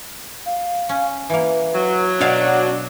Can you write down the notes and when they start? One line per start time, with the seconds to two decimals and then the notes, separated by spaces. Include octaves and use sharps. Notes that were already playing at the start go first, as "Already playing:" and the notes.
0.46 F5
0.89 C#4
1.30 E3 A#3 B4
1.75 F#3
2.21 B2 D4 C#5 F5 F#5